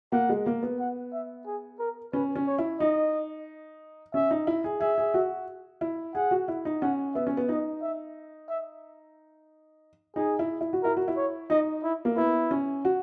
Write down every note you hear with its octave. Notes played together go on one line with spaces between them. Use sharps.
A#3 F#5
G#3
A#3
B3
F#5
E5
G#4
A#4
C#4 B4
C#4
C#5
E4
D#4 D#5
C#4 E5
D#4
E4
G#4
G#4 E5
G#4
F#4
E4
G#4 F#5
F#4
E4
D#4
C#4 F#5
B3 E5
C#4
B3
D#4 D#5
E5
E5
D#4 G#4
E4
E4
F#4
E4 A#4
F#4
E4
C#5
D#4 D#5
E4
A#3
B3 E4
C#4
F#4